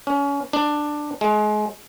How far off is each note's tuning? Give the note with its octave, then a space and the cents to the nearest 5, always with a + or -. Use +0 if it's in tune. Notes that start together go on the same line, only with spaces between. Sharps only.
C#4 +30
D4 +10
G#3 +30